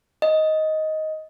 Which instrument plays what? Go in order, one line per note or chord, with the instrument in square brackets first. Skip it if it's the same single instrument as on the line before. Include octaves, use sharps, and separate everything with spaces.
[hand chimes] D#5